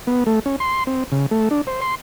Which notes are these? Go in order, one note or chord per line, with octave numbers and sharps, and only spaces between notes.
B3
A3
C#4
C6
C4
C#3
A3
D4
C5
C6